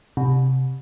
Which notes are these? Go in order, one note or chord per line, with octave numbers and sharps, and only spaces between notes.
C3